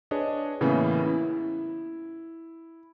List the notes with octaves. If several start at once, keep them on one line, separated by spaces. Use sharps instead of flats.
D4 G#4 B4 C#5 D#5
A2 C#3 E3 A#3 B3 C#4
E4